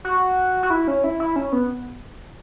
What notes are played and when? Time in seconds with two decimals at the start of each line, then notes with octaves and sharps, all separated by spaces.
0.05 F#4
0.63 F#4
0.70 E4
0.88 C#4
1.04 E4
1.20 E4
1.36 C#4
1.52 B3